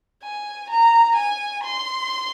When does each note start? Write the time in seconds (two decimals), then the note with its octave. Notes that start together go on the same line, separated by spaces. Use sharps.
0.23 G#5
0.70 A#5
1.16 G#5
1.63 C6